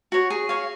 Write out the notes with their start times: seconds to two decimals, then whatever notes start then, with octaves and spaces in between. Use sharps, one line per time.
0.12 F#4 C#5
0.30 G#4
0.49 C#5 F5